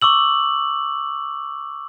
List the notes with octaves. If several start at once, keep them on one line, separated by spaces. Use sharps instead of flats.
C#6 D6 E6 F#7